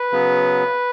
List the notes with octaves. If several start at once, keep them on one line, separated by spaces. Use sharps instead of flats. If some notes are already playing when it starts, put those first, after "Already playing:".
Already playing: B4
C#3 F#3 B3